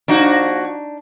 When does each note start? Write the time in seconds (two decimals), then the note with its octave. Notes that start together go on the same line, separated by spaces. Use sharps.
0.08 F3 A#3 D4 D#4 F#4